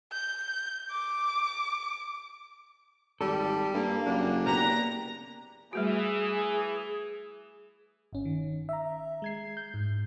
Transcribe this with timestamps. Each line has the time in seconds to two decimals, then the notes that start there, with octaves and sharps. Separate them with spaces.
0.12 G6
0.91 D6
3.21 G#1 G3 A4
3.74 G2 A#3
4.06 F#1 D4
4.47 A#3 B3 G4 A#5
5.73 E3 G3 A3 F#4 G#4
8.13 G1 C#4
8.25 D#3
8.69 E5 A#5
9.22 G#3 G#6 C7
9.57 G6
9.74 G#2